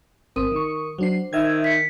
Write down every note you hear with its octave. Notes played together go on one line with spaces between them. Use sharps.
G#1 C4 A#4 D#6 D#7
D#3 C#6
F#3 D4 C5 C7
D#3 E5 G#6
B6 C#7